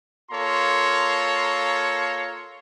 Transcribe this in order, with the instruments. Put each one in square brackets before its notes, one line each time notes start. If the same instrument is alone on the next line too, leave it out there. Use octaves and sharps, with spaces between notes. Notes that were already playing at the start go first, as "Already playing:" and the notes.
[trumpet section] A#3 F4 A4 C#5 A#5 C6